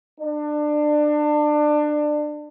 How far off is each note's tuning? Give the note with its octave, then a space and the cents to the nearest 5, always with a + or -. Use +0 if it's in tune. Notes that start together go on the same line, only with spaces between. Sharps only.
D4 +25